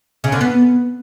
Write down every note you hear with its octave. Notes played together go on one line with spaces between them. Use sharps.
C#3
D3
B3